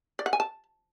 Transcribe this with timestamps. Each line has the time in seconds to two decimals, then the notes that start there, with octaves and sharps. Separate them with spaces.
0.19 D5
0.26 F#5
0.33 G#5
0.40 A5